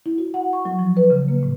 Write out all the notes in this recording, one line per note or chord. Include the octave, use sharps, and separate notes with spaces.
E4
F#4
F#5
C#6
F#3
F3
B4
C#3
A#3
A2